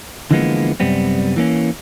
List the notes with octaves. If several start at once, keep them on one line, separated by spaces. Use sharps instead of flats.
D3 E3 F3 G#3 A#3 B3
C2 F#2 G3 B3 C4
E3 A#3 C#4